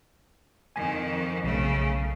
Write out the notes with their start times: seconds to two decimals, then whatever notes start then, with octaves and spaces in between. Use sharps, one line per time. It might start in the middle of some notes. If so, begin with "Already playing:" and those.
0.76 F2 D#3 G#5
1.44 B1 C#3 A3